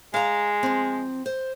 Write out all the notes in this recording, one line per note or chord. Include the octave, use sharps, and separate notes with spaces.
G#3 F5 A#5
F3 C4
C5